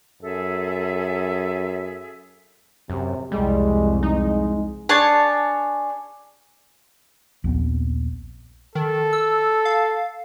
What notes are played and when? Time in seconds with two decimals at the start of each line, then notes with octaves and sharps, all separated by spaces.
0.22 F#2 G#4 A4 E5
2.90 F#2 C3
3.32 C2 F2 G3 G#3
4.03 G#3 D#4
4.89 D4 G#4 C#5 A5
7.44 A#1 D#2 B3 C4
8.75 D#3 A4
9.13 E6
9.65 F5